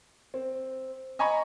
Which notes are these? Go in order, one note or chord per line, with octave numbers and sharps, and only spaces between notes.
C4
D#5 G#5 A#5 B5 C#6